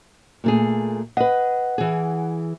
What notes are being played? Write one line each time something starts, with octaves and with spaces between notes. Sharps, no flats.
A#2 A3 G#4
B4 D#5 F#5
E3 G#4